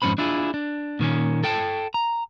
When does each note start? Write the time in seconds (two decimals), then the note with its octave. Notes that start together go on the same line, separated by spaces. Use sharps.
0.02 F2 G#2 F3 C#4 C5 B5
0.18 D4 E4 F4 G#4
0.54 D4
1.00 A#2 D#3 A#3 C#4
1.44 A4 G5 A5
1.94 A#5